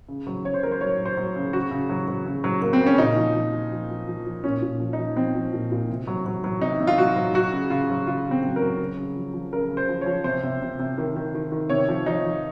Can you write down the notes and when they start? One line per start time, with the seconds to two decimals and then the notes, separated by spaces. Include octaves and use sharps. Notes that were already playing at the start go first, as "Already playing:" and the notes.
0.09 C#3
0.27 F#3
0.44 C#3 C#5
0.54 C5
0.63 F#3 A#4
0.72 C5
0.81 F#3 C#5
0.99 F#3
1.05 C5
1.17 F#3
1.36 C#3
1.53 C#3 F#4
1.71 C#3
1.90 F#3
2.08 F#3
2.26 C#3
2.44 F#3
2.61 F#3 A#3
2.73 C4
2.81 C#3
2.86 C#4
2.98 A#2 D#4
3.16 F3
3.36 F3
3.53 F3
3.72 F3
3.90 F3
4.08 F3
4.26 F3
4.44 A#2 C#4
4.62 A#2
4.80 F3
4.93 D#4
4.99 F3
5.16 F3 C4
5.35 F3
5.53 A#2
5.72 A#2
5.89 C3
6.07 F#3
6.26 F#3
6.44 F#3
6.61 C3 D#4
6.80 C3
6.87 F4
6.98 F#3 F#4
7.16 F#3
7.34 F#3 F#4
7.52 C#3
7.70 C#3 F4
7.90 F#3
8.07 C#3 F4
8.25 C#3
8.31 C4
8.43 F#3
8.56 A#4
8.62 F#3
8.79 C#3
8.97 C#3
9.16 F3
9.34 F3
9.53 C#3 A#4
9.71 C#3
9.77 C5
9.89 F3
10.01 C#5
10.06 F3
10.24 C3 C5
10.43 C3
10.62 C3
10.79 C3
10.98 D#3
11.16 D#3
11.34 D#3
11.52 D#3
11.70 C3 C#5
11.89 F3
12.06 F3 D#4
12.25 F3